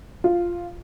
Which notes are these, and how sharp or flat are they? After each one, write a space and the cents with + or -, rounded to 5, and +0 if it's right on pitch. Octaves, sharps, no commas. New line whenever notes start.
F4 -5